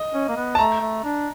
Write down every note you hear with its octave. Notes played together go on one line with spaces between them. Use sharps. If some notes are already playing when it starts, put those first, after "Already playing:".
Already playing: D#5
C#4
A#3
B3
A5
A3 A#5
A3
D4